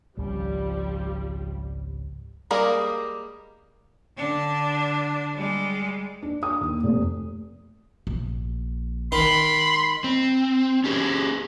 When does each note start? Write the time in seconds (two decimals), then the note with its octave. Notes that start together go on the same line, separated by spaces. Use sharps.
0.17 G#1 C#2 F3 G3
2.51 G3 G#3 A#3 G#4 A#4
4.17 D3 D4
5.35 G3 G#3
6.22 D4
6.43 D#6
6.61 D#2
6.83 F1
8.07 A#1
9.12 D#3 G#3 B5 C6
10.04 C4
10.84 C#4 G4 G#4